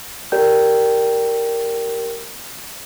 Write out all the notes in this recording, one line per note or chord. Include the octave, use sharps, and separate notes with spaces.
G4 A#4 D5 G5 G6